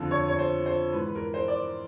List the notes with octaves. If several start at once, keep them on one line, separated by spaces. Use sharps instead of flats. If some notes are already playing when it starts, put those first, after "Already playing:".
Already playing: F2 D3 F3
C#5
C#5
C5
C5
G#2 E3 B4
B4
A#4
B4
C5
D5